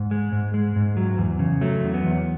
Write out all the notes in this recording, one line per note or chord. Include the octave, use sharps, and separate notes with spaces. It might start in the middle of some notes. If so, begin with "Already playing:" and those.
Already playing: G#2
G#3
G#2
G#3
G#2
F#3
E2
C#3
F#3 A3
E2
B3
E2